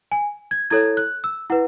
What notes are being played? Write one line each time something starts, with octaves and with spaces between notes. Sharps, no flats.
G#5
G#6
E4 A4 C#5 G#6
F#6
E6
E4 B4 F#5